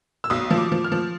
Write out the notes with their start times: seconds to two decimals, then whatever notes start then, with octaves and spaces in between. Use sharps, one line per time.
0.24 E6
0.30 B1 D#6
0.51 F3
0.58 D6
0.72 F3
0.84 F6
0.92 F3